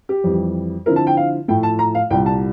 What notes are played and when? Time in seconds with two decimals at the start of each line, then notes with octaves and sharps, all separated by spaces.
0.09 G4
0.24 F2 E3 G3
0.86 D3 F3 C4 E4 A#4
0.96 A5
1.07 G5
1.17 F5
1.48 A2 F3 A3 G5
1.63 A5
1.79 A#5
1.95 F5
2.10 C2 A#2 G3 G5
2.26 A5